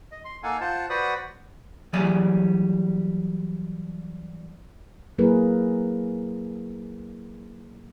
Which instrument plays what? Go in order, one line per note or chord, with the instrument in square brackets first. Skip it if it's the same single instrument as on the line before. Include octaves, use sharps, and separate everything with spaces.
[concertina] D#5
C6
A#3 D#4 A4 F5 F#5 G#5
F4 C5 F#5 A5
F#4 B4 C5 D5 F#5 D#6
[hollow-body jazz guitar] E3 F#3 G3 G#4 D5
[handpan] F#3 A#3 E4 G#4 A#4 B4